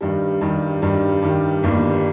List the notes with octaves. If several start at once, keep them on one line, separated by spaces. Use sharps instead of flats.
G2 D#3 G3
G2 D#3 G3
G2 D#3 G3
G2 D#3 G3
G1 G2 D#3 G3 A#3